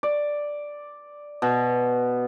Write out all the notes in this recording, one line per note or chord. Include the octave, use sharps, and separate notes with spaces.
D5
B2